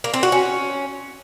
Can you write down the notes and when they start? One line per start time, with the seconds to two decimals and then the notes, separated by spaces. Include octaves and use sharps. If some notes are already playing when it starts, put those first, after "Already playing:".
0.04 A#3
0.14 C4
0.23 F#4
0.32 C#4